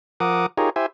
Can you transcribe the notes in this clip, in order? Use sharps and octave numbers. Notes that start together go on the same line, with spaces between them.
F3 A#4 F#5 D6 D#6
D#4 F4 G4 G#4 A#4 C#5
E4 G4 C5 E5 G#5